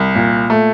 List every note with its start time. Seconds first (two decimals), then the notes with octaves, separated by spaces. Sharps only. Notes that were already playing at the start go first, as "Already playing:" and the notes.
Already playing: C2
0.15 A#2
0.50 A3